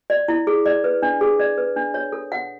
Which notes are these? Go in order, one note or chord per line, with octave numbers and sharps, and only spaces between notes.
D5
E4
G#4
D5
B4
D4
G#4
D5
B4
D4
C#5
A4
F#5